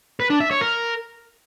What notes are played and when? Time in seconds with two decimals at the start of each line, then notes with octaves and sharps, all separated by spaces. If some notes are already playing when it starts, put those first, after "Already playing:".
0.20 B4
0.30 D4
0.40 E5
0.51 C#5
0.61 A#4